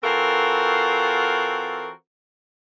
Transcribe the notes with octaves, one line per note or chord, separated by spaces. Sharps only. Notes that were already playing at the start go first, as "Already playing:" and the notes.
E3 C4 F4 F#4 A4 A#4